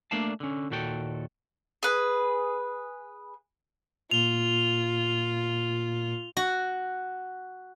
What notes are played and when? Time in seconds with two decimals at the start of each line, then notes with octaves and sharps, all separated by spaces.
0.11 A3 A#3 D4 D5 F5 A5
0.40 D3 C#4
0.70 D#2 A#2 F#4 A4 G5
1.83 G#4 B4
4.11 A#2 F4 F7 G7
6.37 F#4